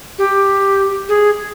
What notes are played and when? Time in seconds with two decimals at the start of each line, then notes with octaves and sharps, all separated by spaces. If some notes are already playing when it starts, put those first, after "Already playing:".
0.18 G4
1.09 G#4